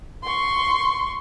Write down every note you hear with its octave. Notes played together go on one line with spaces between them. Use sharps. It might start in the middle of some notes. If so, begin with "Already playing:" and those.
C6 C#6